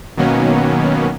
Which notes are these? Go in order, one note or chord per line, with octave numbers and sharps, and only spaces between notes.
B2 D#3 F#3 A#3 B3 C#4